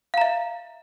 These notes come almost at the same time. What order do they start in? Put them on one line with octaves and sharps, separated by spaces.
F5 A#5 E5